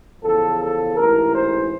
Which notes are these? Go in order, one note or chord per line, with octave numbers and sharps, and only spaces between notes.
E2 C#3 F3 A4
A4
A1 G#2 E3 A#4
C5